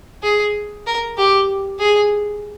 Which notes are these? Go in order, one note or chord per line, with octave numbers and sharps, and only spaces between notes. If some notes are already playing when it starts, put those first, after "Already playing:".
G#4
A#4
G4
G#4